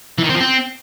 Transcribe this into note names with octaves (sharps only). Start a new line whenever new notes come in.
E3
D#3
C4
F3
C4